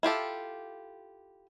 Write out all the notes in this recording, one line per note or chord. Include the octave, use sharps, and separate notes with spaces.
E4 F4 G4 A4